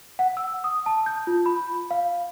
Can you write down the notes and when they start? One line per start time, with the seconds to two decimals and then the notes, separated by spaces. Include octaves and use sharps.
0.19 F#5
0.37 E6
0.64 D#6
0.86 A5
1.06 G6
1.27 F4
1.46 B5
1.91 F5